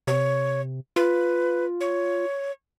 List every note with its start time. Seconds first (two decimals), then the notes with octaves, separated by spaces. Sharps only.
0.07 C3 C#5
0.96 F4 B4
1.81 C#5